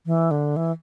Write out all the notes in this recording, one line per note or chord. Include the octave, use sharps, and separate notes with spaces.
E3
D3
E3